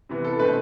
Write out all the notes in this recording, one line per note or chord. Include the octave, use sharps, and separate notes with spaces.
C3 E3 B3
A4
B2 A3 C4 B4